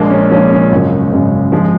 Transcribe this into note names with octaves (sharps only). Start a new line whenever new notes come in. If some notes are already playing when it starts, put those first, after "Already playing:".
Already playing: A#1 A#2 F3 G#3 A#3
C#4
A#1 A#2 F3 G#3 C#4
C#4
G#1 F#2 C#3 G#3 D#4
G#1 F#2 C#3 G#3
F3 G#3